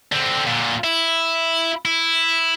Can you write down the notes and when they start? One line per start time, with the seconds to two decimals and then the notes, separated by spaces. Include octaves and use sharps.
0.12 D3 C4
0.47 A#2 D3
0.84 E4
1.85 E4